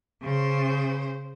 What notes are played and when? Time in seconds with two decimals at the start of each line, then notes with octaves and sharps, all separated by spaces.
0.22 C#3 C5